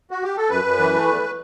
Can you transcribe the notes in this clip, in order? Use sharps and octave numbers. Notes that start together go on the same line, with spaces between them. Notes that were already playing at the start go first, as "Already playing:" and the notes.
F#4
G4
A4
F#2 B4
F#2
E3
A3
E2